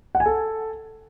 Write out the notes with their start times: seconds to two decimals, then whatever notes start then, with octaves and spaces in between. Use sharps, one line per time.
0.15 F#5
0.20 G#5
0.26 A4